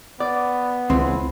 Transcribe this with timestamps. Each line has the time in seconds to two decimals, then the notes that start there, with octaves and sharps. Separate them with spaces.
0.20 B3 D5
0.90 C#2 E3 C4